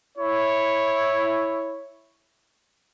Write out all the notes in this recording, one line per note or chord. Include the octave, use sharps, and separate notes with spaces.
E4 C#5